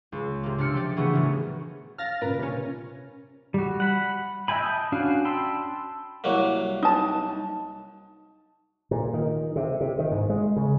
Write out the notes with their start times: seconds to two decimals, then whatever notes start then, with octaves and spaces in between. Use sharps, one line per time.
0.12 C#2
0.43 C3 A#3
0.58 C3 D4 E6 F6 C#7
0.73 F3 G4 D5
0.97 C#3 E3 A3 B3 F#4
1.13 D#1 C#4
1.98 F5 F6 A6 A#6
2.21 A#2 C#3 A#4 B4
2.39 C3 C#4
3.54 G3 F#4
3.80 F#5 B5
4.48 D#5 E5 G5 G#5 B5
4.63 A5 D#6 G6
4.92 C#4 D4 F#4 F5
5.25 G5 A5 B5 C6 E6
6.24 C2 F#3 A#3
6.83 D#4 A5
8.91 A#2
9.14 D#3
9.56 C3
9.81 C3
9.99 D#3
10.11 G#2
10.30 G#3
10.56 C#3